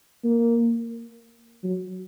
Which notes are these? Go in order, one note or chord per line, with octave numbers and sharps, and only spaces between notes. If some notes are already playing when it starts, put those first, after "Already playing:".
A#3
F#3